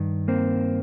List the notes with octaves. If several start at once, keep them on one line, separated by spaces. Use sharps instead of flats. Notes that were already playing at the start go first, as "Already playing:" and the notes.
Already playing: G2 D#3
A#3 C4